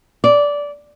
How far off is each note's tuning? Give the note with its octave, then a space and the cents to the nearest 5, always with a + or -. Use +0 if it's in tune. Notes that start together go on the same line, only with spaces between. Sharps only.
D5 -15